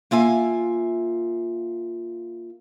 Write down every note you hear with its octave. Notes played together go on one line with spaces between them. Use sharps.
A#3 F4 E5 G#5